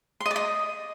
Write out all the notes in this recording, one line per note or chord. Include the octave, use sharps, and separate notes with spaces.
C6
D#5
D5
D#5